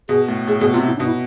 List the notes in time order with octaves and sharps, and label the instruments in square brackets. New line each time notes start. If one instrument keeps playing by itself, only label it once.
[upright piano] B2 [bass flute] G#4
[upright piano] A2
[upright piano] A2 [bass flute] G#4
[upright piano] B2 [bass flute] G#4
[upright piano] C3 [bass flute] F4
[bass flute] E4
D4
[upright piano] B2
[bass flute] E4